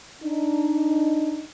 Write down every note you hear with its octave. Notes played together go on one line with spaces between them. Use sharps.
D4 D#4